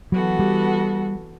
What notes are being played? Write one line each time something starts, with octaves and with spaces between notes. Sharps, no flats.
E3 F#3 B3 F#4 A4
G3